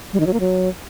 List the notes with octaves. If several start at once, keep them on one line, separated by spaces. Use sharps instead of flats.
G3
D#3
F#3
A#3
F#3